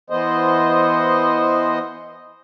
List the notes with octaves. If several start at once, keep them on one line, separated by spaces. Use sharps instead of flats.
E3 B3 C5 D#5